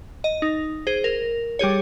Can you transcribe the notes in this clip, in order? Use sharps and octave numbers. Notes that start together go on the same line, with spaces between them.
D#5
D#4
G#4 C5
A#4
G3 G4 G#4 C#5